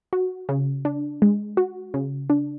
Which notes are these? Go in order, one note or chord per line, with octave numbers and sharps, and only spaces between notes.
F#4
C#3
D4
G#3
F#4
C#3
D4